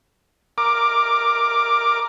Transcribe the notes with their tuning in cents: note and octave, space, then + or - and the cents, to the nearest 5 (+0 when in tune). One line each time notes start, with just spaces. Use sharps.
A#4 +0 D6 +10